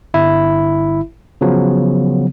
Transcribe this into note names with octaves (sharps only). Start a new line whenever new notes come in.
G1 E4 E5
C#3 F3 F#3 B3